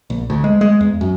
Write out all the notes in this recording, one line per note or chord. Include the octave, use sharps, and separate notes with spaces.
A#1
D2
G#3
G#3
E2
F#2